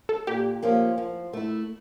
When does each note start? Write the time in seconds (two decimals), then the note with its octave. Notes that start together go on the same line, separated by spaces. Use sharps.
0.09 A4
0.27 A#2 G4
0.63 F3 A#3 C#4 F4
0.98 F3
1.33 A3 E4